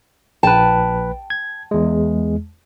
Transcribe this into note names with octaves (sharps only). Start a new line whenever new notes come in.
A#1 B4 G5 A5
G#6
E2 G#3